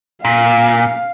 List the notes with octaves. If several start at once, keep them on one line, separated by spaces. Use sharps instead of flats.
A#2 F5